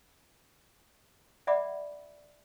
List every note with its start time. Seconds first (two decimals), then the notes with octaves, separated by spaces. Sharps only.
1.47 D5 E5 F#5 B5 D6